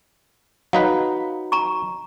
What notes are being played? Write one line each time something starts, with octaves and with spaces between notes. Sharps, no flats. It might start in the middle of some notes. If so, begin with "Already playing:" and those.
F#3 D#4 B4 F5
A#5 C#6